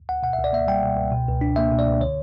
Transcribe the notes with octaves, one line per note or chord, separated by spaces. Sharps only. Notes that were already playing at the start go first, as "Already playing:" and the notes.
D2 F#5
B2 F#5
E5
C#2
D5
A#3 E5
G3 G5
B2
C#2
B2
C#2
D4
A#3 E5
B2
D5
C#2
D3 C#5